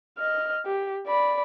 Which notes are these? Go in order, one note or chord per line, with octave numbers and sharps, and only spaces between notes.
D#5 F6
G4
D5 B5